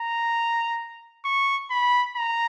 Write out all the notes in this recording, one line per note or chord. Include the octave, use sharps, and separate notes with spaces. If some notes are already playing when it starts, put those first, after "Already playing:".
Already playing: A#5
C#6
B5
A#5